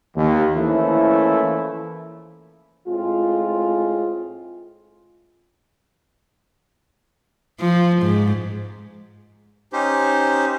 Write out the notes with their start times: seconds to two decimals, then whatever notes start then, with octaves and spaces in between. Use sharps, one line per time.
0.16 D#2
0.55 E3 F3 A3 A#3 C#4 E4
2.88 A2 G#3 C4 F4
7.60 F3
8.02 G#2
9.73 C#4 D#4 G4 C5